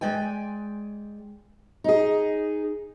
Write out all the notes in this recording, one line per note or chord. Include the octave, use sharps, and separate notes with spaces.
G#3 D5 G5 G#5
D#4 G#4